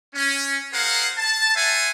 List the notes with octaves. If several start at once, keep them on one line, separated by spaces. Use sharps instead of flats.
C#4
G#4 A#4 C5 F5 F#5
A5
C5 E5 F#5 G#5